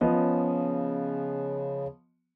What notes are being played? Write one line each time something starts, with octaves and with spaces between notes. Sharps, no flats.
C#3 F3 B3 D#5